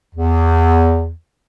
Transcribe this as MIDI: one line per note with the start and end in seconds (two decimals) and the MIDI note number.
0.15 1.11 40